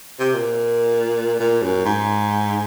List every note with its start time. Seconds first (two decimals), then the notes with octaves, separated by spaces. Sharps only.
0.20 C3
0.34 A#2
1.40 A#2
1.62 F#2
1.85 G#2